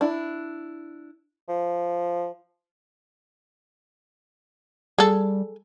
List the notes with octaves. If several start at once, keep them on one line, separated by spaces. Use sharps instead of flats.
D4 E4
F3
G3 G#4 A4